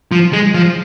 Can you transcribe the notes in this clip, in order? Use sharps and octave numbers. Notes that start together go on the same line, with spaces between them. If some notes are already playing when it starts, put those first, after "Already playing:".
F3
G#3
F3